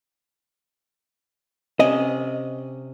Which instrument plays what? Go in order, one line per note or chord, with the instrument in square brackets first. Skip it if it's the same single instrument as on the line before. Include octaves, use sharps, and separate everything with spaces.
[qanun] C3 C#4 D5 [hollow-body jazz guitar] D#5